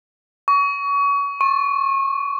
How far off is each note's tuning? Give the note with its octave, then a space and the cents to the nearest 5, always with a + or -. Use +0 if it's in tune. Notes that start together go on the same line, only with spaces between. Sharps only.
C#6 +30
C#6 -30